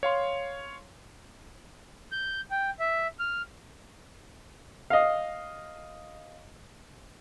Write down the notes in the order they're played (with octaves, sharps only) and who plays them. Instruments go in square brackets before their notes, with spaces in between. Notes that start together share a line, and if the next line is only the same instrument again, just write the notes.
[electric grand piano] C#5 F5 C6
[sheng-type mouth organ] G6
G5
E5
F6
[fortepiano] D#5 F5